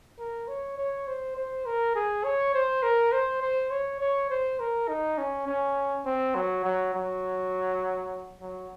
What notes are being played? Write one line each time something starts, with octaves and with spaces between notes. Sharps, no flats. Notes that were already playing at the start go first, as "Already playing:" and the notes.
A#4
C#5
C#5
C5
C5
A#4
G#4
C#5
C5
A#4
C5
C5
C#5
C#5
C5
A#4
D#4
C#4
C#4
C4
F#3
F#3
F#3
F#3